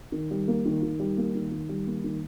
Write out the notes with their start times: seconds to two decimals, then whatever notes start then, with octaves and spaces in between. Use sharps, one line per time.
0.12 D#3
0.31 G3
0.48 A#3
0.65 D#3
0.83 D#3
0.99 G3
1.17 A#3
1.35 D#3
1.52 D#3
1.69 G3
1.87 A#3
2.04 D#3